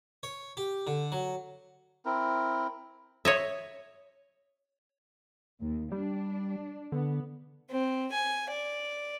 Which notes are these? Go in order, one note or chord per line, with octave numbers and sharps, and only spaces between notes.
C#5
G4
D3
F#3
C4 E4 A#4
C#5 D#5 E5
D#2
G3 D4
D3 B3
C4
G#5
D5